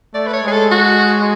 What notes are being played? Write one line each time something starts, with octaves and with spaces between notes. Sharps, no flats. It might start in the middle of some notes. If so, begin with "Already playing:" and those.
A3 D5
B4
C#5
G#3 G#4
A4
F#4